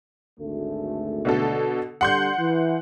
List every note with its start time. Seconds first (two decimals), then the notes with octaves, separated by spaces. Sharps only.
0.39 G#1 D2 A3
1.25 B2 D3 A4
2.01 D3 G3 D4 F#5 C6 G6
2.39 E3